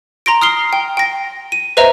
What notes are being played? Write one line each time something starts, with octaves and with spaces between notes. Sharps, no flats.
A#5 C6 A#6 D7
D#6 F6 C7 G7
G5
G5 A#6
D#7
B4 C5 D#5 E5 A#5